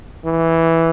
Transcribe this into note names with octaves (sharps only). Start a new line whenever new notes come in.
E3